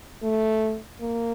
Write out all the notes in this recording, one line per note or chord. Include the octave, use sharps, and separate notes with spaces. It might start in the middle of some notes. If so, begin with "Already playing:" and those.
A3
A#3